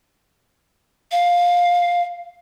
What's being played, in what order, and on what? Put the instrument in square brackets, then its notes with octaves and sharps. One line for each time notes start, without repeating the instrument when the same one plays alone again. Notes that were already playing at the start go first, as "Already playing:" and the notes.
[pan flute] F5